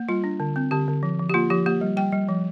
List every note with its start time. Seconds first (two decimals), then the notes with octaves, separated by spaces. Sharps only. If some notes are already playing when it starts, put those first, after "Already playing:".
Already playing: A#3
0.09 G3 F4
0.24 D4
0.40 D3
0.56 C4
0.71 D3 G4
0.88 D3
1.03 F3
1.19 F3
1.29 G4
1.34 A#3 F4
1.50 F3 G4
1.66 A#3 G4
1.81 G3
1.97 G3 G5
2.12 G3
2.29 F3